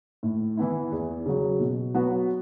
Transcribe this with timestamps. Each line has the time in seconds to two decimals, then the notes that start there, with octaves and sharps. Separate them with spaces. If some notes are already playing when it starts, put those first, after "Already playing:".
0.23 A2
0.57 E3 B3 E4
0.92 E2
1.26 C#3 F#3
1.60 B2
1.94 F#3 B3 F#4